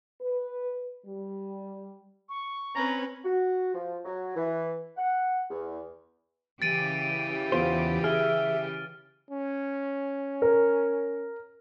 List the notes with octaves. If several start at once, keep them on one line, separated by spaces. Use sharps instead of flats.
B4
G3
C#6
C4 C#4 B4 A#5
F#4
F3
F#3
E3
F#5
E2
C#3 E3 G4 A6 D7 D#7
E2 B3 F4 C5
G#4 E5 F6
C#4
A#4